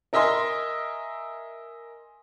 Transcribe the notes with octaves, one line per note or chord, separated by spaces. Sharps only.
A#4 D#5 E5 G#5 C6